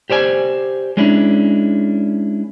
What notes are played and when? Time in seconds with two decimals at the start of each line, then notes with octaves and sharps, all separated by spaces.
0.10 G4 C5 D5 G#5
0.97 G#3 C#4 D4 E4